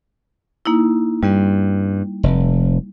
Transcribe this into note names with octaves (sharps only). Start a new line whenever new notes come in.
A#3 D#4 E4
G2 G3
F1